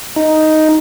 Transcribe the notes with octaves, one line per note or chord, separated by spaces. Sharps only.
D#4